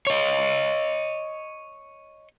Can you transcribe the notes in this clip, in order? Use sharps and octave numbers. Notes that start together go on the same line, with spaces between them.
C#5 D#5